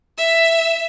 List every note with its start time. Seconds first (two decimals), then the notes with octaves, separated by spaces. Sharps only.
0.18 E5